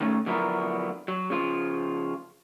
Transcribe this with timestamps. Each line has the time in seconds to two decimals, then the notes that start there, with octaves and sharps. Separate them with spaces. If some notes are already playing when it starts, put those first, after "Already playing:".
0.01 D#3 A3 C#4
0.26 D3 F3 F#3 B3 E4 A#4
1.08 F#3
1.30 C#3 F3 F4